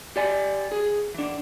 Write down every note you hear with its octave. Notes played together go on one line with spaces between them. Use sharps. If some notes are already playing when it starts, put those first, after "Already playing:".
G4 D5 G#5
G#4
E3 D4